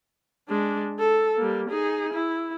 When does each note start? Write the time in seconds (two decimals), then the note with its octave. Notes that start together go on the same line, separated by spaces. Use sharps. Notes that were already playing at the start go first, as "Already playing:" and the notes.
0.49 G#3 D4
0.99 A4
1.38 G3 A#3
1.70 D#4 G#4
2.13 E4